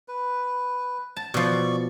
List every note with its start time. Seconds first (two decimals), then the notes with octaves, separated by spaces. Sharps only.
0.08 B4
1.17 A5
1.34 B2 F3 D5 C#6